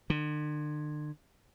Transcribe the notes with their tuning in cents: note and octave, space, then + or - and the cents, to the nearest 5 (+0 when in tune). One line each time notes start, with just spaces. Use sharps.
D3 +40